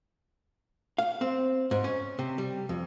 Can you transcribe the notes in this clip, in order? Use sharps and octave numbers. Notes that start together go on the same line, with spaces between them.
F5
C4
G#2
C#4
C3
G3
F2